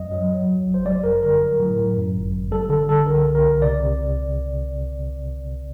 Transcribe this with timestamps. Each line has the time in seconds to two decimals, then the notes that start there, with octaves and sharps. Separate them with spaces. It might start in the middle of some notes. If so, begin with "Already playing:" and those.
Already playing: F#2 F#3 D#5
0.11 F#3
0.31 F#3
0.49 F#3
0.68 G1
0.74 C5
0.85 G3 D5
1.04 F#2 A#4
1.22 D3 A#4
1.41 F#3
1.60 A2
1.78 F#3
1.96 F#2
2.14 G1
2.34 G1
2.51 G3 A4
2.69 D3 A4
2.88 D3 A4
3.07 C2 A#4
3.25 C2
3.35 A#4
3.44 C2
3.62 C3 D5
3.81 C3